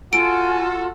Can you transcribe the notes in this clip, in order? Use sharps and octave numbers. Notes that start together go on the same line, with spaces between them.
F4 F#4 A4 G#5 D7